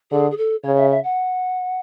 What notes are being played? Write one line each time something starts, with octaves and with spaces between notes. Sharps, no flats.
D3 G#4
G#4
A4
C#3 C#5
E5
E5
F#5